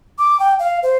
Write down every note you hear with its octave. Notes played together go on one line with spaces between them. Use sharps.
D6
G5
F5
C5